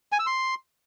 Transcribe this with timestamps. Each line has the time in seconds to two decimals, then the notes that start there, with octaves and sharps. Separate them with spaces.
0.12 G#5
0.19 E6
0.26 C6